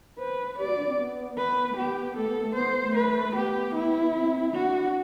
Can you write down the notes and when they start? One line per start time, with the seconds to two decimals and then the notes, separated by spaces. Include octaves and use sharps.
0.19 B4 C5
0.58 G4 D5
0.68 F#4
0.78 D4
0.88 C4
0.97 B3
1.37 B3 B4
1.69 A3
1.77 B3 G4
2.17 A3 A4
2.29 B3
2.43 A3
2.55 B3 C5
2.83 A3
2.96 B4
3.35 B3 G4
3.75 E4
4.14 C4
4.53 D4 F#4